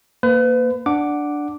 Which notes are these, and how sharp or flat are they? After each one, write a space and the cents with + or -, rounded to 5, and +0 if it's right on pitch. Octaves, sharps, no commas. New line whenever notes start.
A#3 +0 B4 +35
D4 +0 F#5 +0 D6 +0